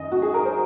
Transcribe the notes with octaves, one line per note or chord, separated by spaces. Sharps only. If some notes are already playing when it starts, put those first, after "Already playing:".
Already playing: F#2 D#3 D#5
F#4
G#4
A#4
C5